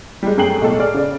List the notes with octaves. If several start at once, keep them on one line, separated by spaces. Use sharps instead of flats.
G3 G#3
F#2 A3 G#4 G5 C7 F#7
B1 A2 G#3 A4
G#4 D5 F6
C#3 D5